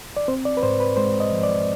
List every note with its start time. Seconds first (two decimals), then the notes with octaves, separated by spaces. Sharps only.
0.17 D5
0.28 C4 C5
0.45 D5
0.57 B4
0.63 G#2 C5
0.80 B4
0.97 G#3 C5
1.20 D#5
1.32 F3
1.43 D5